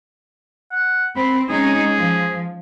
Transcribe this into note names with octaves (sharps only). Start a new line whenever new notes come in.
F#5
C4 B5
G#3 C#4 D#4 G#4
F3